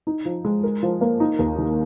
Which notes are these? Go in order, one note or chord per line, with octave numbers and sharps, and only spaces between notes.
D#4
F3
G#3
A#4
F3
A#3
D#4
D#2
D#3